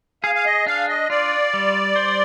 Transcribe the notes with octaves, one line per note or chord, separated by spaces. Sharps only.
G#4 F5
F5
D#5
D4 F5
D#5
F4 D5
G3
C5